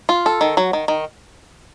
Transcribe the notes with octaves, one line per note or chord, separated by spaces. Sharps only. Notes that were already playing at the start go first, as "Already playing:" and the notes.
F4
A4
D#3
F#3
D#3
D#3